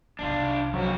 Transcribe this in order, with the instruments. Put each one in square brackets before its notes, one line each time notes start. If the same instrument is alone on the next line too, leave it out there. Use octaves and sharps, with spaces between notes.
[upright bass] C2 D#3 [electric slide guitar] D4 F4
[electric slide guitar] F2 F#4 [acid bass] F#3